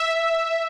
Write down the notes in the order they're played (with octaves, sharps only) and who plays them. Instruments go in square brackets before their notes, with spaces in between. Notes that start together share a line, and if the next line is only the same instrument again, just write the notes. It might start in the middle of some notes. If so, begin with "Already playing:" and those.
Already playing: [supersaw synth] E5